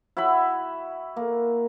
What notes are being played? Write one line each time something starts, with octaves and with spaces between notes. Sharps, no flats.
E4 F#4 E5 B5
A#3